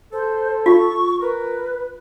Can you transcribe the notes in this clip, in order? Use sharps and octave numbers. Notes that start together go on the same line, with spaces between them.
A4 C5
F4 C#6
A#4 B4